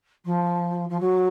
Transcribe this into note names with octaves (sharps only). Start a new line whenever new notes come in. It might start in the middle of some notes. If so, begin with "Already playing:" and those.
F3
F3
F#3